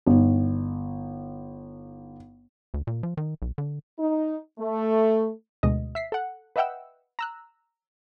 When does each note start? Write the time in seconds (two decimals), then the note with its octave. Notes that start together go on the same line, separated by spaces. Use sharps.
0.06 G1 D#4
2.74 D2
2.87 A#2
3.03 F3
3.17 D#3
3.42 B1
3.58 D3
3.99 D#4
4.58 A3
5.63 D2 B2 G#3 D#5
5.95 E5 B6 C7
6.12 A4 F#5
6.56 B4 D#5 E5 F#5 G5 E6
7.19 A#5 E6 F#6